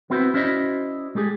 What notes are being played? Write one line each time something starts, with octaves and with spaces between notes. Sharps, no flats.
B3 C4 E4 F#4 B4 C5
C#4 E4 F#4 C5 D5 D#5
G#3 A3 G4 G#4